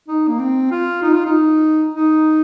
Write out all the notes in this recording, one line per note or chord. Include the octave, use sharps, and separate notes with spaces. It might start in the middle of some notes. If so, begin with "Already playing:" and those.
D#4
A#3
C4
F4
D#4
F4
D#4
D#4